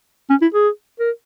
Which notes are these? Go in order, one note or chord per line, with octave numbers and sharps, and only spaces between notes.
C#4
E4
G#4
A#4